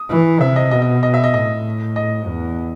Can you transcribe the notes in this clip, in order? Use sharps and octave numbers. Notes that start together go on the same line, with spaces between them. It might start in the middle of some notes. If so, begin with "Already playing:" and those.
Already playing: D#6
E3
C3 E5
D#5
B2 D#5
D#5
D#5
E5
D#5
A2 D#5
D#5
E2